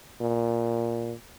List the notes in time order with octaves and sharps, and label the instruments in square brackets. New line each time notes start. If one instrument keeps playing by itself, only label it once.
[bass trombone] A#2